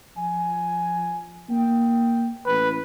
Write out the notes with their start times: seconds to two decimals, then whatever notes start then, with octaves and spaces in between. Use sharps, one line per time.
0.17 F3 G#5
1.49 A#3 G5
2.47 A1 B4